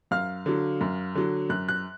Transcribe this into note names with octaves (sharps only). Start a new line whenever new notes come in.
F#2 F5 F6
D3 F#3
F#2
D3 F#3
F#2 F#6
F#6